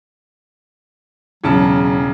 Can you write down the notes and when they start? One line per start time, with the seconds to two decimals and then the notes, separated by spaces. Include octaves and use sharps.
1.44 E1 C#3 F#3 A5